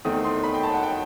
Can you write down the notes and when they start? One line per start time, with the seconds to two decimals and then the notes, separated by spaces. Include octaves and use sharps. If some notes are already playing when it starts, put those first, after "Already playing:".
0.05 E2 D#3 A3 C4 D#6
0.24 C6
0.44 B5
0.54 G5
0.63 A5
0.73 F#5
0.83 G5